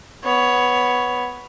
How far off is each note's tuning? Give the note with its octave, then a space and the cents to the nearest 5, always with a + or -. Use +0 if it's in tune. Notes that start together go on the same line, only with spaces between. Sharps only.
B3 +0 C#5 +10